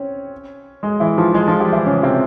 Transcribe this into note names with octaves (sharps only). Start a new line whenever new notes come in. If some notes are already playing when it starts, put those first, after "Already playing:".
Already playing: C4 C#4 C#5
G#3 G#4
E3 E4
F3 F4
G#3 G#4
F3 F4
G3 G4
E3 E4
C#3 C#4
C3 C4